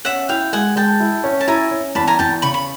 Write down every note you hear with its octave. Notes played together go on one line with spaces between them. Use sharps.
C#4 E5 F#5
E4 F5 G5
G#3 F#5 G#5
G#3 G5 A5
E4
C#4
A5
E4 G#5 A#5
C#4
E2 A5 B5
G#5 A#5
E2 G5 A5
C#3 B5 C#6
B5